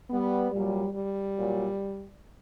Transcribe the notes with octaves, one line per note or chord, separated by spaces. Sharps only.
G3 B3
A#2 F#3 G3
G3
A#2 F#3